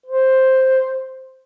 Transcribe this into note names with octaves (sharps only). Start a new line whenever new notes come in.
C5